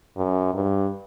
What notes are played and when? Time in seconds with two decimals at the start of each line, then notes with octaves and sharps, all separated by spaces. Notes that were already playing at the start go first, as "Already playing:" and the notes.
0.17 F#2
0.54 G2